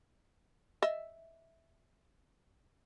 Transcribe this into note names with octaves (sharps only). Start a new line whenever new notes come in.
D#5 E5